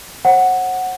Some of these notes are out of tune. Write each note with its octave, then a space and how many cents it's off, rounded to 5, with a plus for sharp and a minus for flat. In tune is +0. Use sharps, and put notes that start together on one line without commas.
C5 +45 F#5 +0